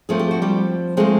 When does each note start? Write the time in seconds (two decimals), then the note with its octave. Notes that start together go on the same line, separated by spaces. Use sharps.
0.09 F3 A3 C4 G#4
0.19 G4
0.31 F#4
0.42 G3 G4
0.97 F3 G#3 A3 C4 G#4